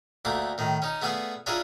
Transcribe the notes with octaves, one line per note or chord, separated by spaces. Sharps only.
D2 A3 A#3 D6
A2 D#3
C#4 D#4
A3 B3 G#4 D5 F5
C#4 D4 E4 F4 G#4 A#4